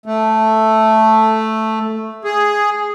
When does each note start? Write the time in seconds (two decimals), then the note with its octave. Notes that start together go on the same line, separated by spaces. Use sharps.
0.06 A3
2.24 G#4